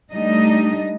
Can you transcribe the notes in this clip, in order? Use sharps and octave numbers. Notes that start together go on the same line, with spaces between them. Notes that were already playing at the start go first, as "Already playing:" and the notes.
G3 A3 D4 D#4 D#5